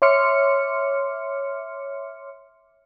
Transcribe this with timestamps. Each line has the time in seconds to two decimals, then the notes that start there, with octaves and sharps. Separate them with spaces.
0.02 C#5 E5 C6 D6 F6 C#7